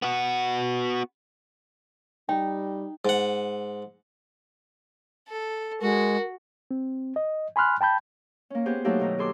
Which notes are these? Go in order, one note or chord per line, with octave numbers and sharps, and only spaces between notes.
B3 F#4
G3 D#4 G5
G#2 F#5
A4
G#3 F#4 A#4
C4
D#5
G#5 B5 C6 F6 F#6
G5 A5 B5 G6
A#3 C#4
B3 G4 G#4 C5
F#3 A3 A#3 D#4 G4 A4
B2 D#3 A#5
G#4 A4 C6 D6